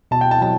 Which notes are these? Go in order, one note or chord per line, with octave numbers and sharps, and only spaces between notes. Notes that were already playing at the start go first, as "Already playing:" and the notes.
B2 A5
G5
A5
F#3 A5